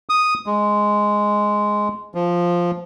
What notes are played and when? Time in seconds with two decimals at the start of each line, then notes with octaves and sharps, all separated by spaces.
0.09 D#6
0.47 G#3
2.15 F3